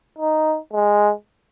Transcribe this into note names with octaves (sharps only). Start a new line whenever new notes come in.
D#4
G#3